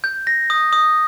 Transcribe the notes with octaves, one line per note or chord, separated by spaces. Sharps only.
G6
A#6
D#6
D#6